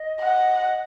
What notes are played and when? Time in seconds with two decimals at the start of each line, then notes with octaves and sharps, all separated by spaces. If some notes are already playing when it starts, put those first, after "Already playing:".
Already playing: D#5
0.20 F#5